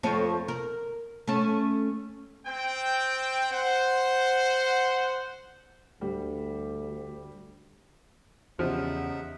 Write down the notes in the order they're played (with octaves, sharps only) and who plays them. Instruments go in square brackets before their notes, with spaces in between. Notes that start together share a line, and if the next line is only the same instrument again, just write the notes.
[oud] F2 A3 C#5
A#4
A3 C#4
[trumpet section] C4 G5
C5 F#5
[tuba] D2 [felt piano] G3
[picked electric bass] E2 [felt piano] C#3 G4 [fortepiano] F3 [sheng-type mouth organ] D#4 E5 F#5